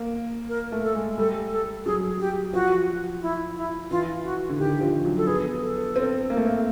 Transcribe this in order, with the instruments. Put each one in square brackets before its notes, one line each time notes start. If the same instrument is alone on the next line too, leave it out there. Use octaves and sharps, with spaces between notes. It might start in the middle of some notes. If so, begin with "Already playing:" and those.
Already playing: [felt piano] A#3
[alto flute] A#4
[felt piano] A3
[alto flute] A4
[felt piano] G#3
[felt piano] G3 [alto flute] A4
[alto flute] A4
[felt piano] F#3 [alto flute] G#4
[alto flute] G4
[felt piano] F3 [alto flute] F#4
[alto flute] E4
E4
[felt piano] E3 [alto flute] F4
[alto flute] F#4
[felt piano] D3
[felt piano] D#3 [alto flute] G4
[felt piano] F3
F#3
[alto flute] A4
[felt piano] B3 [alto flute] G#4
[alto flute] A4
[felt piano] C4
A#3
A3
A#3